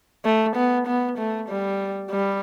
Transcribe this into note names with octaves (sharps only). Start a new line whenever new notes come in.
A3
B3
B3
A3
G3
G3